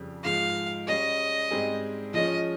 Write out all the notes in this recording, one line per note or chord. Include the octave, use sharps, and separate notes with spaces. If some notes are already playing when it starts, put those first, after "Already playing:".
Already playing: F2 C#3 G3
G#2 F3 G#3 F5
G3 C#4 G#4 D#5
G#2 G3 C4 D#4 G#4
F3 G#3 C#4 D#5